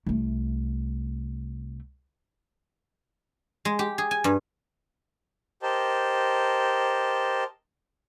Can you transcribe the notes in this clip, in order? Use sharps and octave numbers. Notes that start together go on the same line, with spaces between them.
C2 A3
G#3
G4
G#4
G#5
G2
G4 A#4 C5 D#5 A5